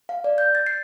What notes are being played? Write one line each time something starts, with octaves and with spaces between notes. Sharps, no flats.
F5
D5
G6
A6
C7